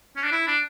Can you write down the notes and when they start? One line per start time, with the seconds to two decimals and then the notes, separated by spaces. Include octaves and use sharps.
0.16 C#4
0.24 D4
0.32 E4
0.47 D4